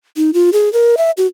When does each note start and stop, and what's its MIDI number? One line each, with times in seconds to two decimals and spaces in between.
0.17 0.31 63
0.34 0.50 65
0.53 0.71 68
0.73 0.95 70
0.97 1.11 76
1.17 1.27 66